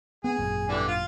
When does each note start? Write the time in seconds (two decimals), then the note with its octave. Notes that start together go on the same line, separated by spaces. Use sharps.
0.24 B3 G#4
0.38 G#1 F#2 A#2
0.69 D3 E3 G3
0.88 F4